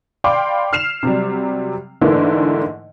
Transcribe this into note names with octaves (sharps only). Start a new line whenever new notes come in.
D5 F5 G5 B5 C6 D6
F6 C7 E7 F7
C3 F#3 G3
G#2 D3 E3 A3 A#3 E4